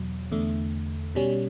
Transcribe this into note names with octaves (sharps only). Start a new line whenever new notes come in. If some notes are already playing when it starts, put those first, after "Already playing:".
Already playing: E2 B2 F#3
E2 D3 A3
B2 G3 C#4